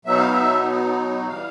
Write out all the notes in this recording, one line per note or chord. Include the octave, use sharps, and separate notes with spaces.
B2 F#3 B3 D#4 E5
F5
E5
E3 G3 F5